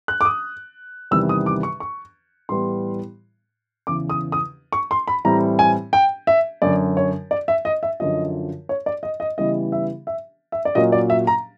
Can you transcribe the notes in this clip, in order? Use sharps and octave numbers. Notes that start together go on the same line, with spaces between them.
F#6
D6
D#6
E2 C3 D#3 G3 E6
D#6
D6
C#6
C#6
A2 E3 G3 B3 C6
E2 C#3 E3 D6
D#6
D#6
C#6
C6
B5
A2 E3 G3 C4 A#5
G#5
G5
E5
F#2 D3 F#3 D5
C#5
D5
E5
D#5
E5
F#2 D3 F3 D#5
C#5
D5
D#5
D#5
C#3 E3 G3 B3 D#5
E5
E5
E5
D5
A#2 F#3 A#3 C#4 D#5
D5
E5
A#5